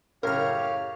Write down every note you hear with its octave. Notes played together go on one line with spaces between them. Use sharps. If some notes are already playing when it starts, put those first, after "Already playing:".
F#2 A2 C#3 G4 A#4 C#5 F5 F6